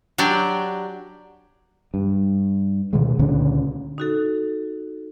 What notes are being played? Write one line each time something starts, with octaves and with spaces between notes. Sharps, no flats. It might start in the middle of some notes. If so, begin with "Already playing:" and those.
F#3 D4 G4 D5
G2
D2 B2 D#3 G#3
C#2 A#2 D3 C#4
D#4 F#4 A4